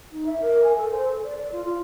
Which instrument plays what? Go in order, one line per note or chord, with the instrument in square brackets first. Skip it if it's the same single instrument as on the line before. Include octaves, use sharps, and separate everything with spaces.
[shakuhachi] D#4
E5
A#4
G#5
A4
C5
A4
D5
D5
F4
F4